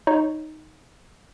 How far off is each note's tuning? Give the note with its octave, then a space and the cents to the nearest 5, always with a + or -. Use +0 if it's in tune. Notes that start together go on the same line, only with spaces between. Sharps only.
D#4 +0 C#5 +5